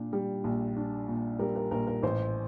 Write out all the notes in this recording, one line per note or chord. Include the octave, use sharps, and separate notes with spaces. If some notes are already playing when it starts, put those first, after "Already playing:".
Already playing: A#2 D4
G3
A#1
D4
A#2
G3 A#4
A#4
A#1 A#4
A#4
A1 C5